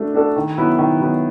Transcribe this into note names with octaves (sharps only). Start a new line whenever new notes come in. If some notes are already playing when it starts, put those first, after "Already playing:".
Already playing: A3 D4 F#4 A4
D4 F#4 A4
D#3
F#3 B3 E4
D#3
F#3 B3 E4